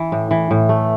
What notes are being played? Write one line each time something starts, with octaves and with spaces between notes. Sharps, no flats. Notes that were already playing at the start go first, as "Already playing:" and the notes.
Already playing: E3
A2
E3
A2
A3